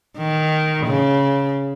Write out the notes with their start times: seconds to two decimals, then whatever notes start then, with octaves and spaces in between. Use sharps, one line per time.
0.18 D#3
0.87 C#3